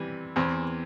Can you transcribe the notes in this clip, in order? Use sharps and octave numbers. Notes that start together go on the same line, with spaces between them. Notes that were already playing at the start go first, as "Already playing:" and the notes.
Already playing: C3 E3 G3
E2 E3 C4